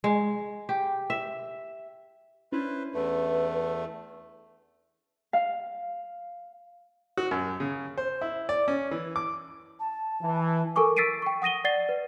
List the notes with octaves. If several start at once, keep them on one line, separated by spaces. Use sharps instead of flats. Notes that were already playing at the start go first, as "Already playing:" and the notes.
G#3
G4
E5
C#4 D4 E4 B4 C5
E2 A3 B4
F5
F#4
F#2
C#3
C5
E4
D5
C#4
E3
D6
A5
E3
A4 A#4 G#5 C#6 D6
E6 A6 B6 C7 D7 D#7
G5 C#6
F#5 D#6 A#6 D#7 G7
D5 F#5 A6 C7 G7
B4